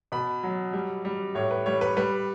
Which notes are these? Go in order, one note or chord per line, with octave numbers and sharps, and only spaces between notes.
B2 B5
F#3
G3
G3
A2 C#5
B4
G3 C#5
B4
G3 B4